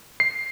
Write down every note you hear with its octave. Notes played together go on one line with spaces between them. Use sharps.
C7